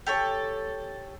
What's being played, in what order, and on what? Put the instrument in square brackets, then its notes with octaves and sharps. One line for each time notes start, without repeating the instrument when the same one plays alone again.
[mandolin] G4 A4 C#5